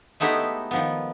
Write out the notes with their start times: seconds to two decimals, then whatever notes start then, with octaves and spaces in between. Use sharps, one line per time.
0.20 G#3 A3 B3 D#4 E4 G4
0.71 D#3 F3 B3